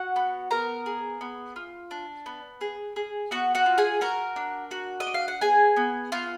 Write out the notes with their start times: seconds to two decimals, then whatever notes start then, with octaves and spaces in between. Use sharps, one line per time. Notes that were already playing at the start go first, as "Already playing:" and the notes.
Already playing: F#4 F#5
0.16 B3
0.51 B3 A#4 A#5
0.86 G#4
1.21 B3
1.56 F4
1.91 D4
2.26 B3
2.61 G#4
2.96 G#4
3.31 B3 F#4 F#5
3.55 F#4 F#5
3.66 F4
3.78 G#4 G#5
4.01 F#4 A#4 A#5
4.36 D4
4.71 F#4
5.00 D#5
5.07 D4
5.14 F5
5.28 F#5
5.41 B3 G#4 G#5
5.77 B3
6.12 B3 F4 F5